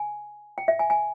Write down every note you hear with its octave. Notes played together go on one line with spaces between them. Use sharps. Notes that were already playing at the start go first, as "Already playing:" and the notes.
Already playing: G#5
G5
E5
G#5
G#5